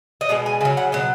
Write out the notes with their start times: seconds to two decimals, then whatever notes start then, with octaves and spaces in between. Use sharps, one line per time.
0.21 D#5
0.29 B2 G#3 F#5
0.46 G#5
0.61 C#3 G#5
0.65 F#3
0.77 F#5
0.92 B2 F#3 D#5